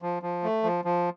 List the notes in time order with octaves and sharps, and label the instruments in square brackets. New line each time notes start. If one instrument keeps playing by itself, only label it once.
[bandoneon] F3
F3
A3
F3
F3